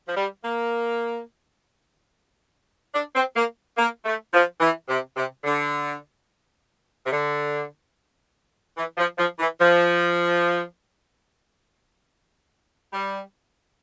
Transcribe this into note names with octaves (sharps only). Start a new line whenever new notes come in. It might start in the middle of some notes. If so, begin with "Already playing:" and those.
F3
G3
A#3
D4
C4
A#3
A#3
A3
F3
E3
C3
C3
D3
C3
D3
E3
F3
F3
E3
F3
G3